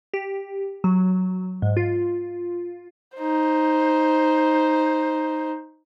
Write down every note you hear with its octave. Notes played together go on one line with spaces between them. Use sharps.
G4
F#3
G#2
F4
D#4 C5